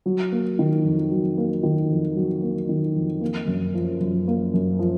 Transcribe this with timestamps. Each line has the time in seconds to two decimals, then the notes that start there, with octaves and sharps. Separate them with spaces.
0.06 F#3
0.32 A#3
0.59 D#3
0.85 F2
1.11 F#3
1.38 A#3
1.63 D#3
1.90 F2
2.16 F#3
2.42 A#3
2.69 D#3
2.96 F2
3.21 A#3
3.47 F#2
3.74 F3
4.01 F#2
4.28 A#3
4.54 F#2
4.79 F3